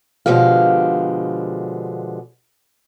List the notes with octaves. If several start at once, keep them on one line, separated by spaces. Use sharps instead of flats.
B2 D3 F3 G#3 G4 F5